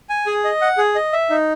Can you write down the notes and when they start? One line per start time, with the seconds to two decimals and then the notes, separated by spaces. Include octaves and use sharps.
0.09 G#5
0.26 G#4
0.44 D#5
0.61 F#5
0.78 G#4
0.95 D#5
1.13 E5
1.30 D#4